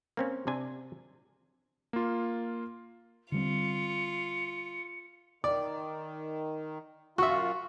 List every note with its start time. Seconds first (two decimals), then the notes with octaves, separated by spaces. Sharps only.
0.17 A#3 C4 C#4
0.47 C3 D4 G#5
1.93 A#3 F4
3.32 D3 G3 C4 F4 C#7
5.44 D#3 D5
7.18 F#2 F4 F#4 E5 C#6